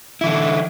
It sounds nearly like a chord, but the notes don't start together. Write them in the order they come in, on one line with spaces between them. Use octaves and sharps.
E4 E3 D3